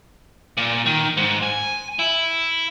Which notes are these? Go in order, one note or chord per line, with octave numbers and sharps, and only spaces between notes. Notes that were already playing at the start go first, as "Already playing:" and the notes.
A#2
D#3
G#2
G#5
E4